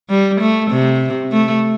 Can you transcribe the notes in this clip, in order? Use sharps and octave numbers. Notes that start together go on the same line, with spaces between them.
G3
A3
C3
A3